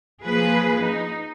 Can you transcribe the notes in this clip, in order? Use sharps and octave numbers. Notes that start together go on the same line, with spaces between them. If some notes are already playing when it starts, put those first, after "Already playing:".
F3 A#3 G#4 B4
D#4